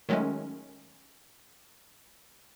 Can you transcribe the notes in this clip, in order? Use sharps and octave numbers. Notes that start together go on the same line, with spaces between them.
D#3 F#3 G#3 A3 C#4